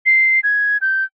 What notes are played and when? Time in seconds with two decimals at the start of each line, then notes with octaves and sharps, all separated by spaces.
0.06 C7
0.43 G#6
0.81 G6